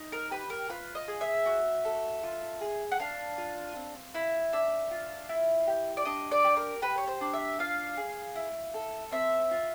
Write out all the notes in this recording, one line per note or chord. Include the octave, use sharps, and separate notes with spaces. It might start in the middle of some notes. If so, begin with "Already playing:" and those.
Already playing: D#4
A#4
G4 B4
A#4
F4 B4
D#5
G#4
E5
F#4
A4
F4
G#4
F#5
D4 F5
F4
C4
E4
D4 E5
F4
E4
G4
D5
D4 D#5
D5
G4
A#4
G4 B4
C#5
C5
D4
E5
F4 F5
G#4
E4
A4
C4 E5
F4